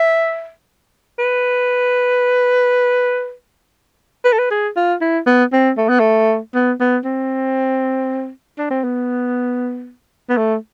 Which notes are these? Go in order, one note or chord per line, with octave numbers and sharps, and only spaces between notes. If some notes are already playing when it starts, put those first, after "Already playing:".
Already playing: E5
B4
B4
A4
B4
G#4
F4
E4
B3
C4
A3
B3
A3
B3
B3
C4
D4
C4
B3
B3
A3